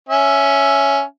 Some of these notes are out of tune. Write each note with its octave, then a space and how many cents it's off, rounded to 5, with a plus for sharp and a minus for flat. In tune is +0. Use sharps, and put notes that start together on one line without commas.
C#4 +10 E5 +10